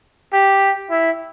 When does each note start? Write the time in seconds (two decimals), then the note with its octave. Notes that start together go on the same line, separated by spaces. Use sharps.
0.33 G4
0.90 E4